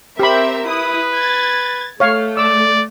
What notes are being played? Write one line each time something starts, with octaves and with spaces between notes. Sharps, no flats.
C4 G4 A#4 E5 B5
E4 B4 D#6
G#6 A6
A3 C#5 F5
D5 D6 E6